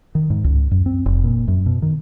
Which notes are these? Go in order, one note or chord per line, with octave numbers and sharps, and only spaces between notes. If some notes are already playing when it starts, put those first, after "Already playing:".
D#3
G#2
C#2
F#2
C4
F1
A#2
F#2
B2
D#3